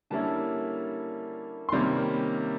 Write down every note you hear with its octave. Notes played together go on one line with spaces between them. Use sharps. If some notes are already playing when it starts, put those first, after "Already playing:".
D3 G3 A#3 C#4 E4 A5
C6
C3 D#3 G3 A#3 C#4 B5